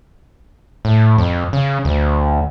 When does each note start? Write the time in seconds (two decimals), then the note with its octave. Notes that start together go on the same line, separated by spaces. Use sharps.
0.85 A2
1.18 F2
1.53 C#3
1.85 D2